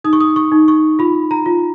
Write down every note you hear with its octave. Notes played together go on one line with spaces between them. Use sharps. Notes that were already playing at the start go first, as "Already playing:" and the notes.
D#4 D#6
C#6
D#6
C#6
D#4
C#6
F4 B5
A#5
F4